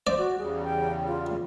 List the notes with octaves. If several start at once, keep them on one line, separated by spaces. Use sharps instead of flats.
C5 D5
F#4
E2 C#3 G3 G#4
G5
F4